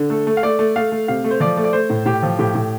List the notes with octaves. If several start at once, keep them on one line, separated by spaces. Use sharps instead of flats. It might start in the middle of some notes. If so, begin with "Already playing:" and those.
Already playing: D3
A3 A4
A3
F5
A3 D5
A3
A3 F5
A3
C3 F5
A3
C5
F3 D5
A3
D5
A3 C5
A2
A2 G4
F3
A2 G4
A2